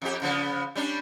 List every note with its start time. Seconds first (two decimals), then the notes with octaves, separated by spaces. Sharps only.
0.02 F2 G4
0.22 C#3 F3 B3
0.75 G3 C#4 D4